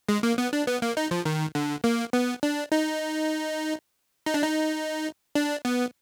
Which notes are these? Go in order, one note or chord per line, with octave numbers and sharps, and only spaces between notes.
G#3
A#3
B3
D4
B3
A#3
D#4
F3
D#3
D3
A#3
B3
D4
D#4
D#4
D4
D#4
D4
B3